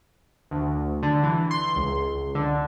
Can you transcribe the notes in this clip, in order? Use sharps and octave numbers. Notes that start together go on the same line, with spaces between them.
D2
D3
E3
C6
C#2
D3